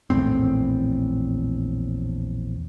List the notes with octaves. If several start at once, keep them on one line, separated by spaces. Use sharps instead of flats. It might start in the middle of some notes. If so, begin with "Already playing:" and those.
A#1 E2 A2 C4